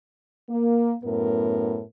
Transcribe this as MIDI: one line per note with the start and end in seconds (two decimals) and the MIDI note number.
0.48 0.94 58
1.04 1.81 42
1.04 1.81 45
1.04 1.81 59
1.04 1.81 70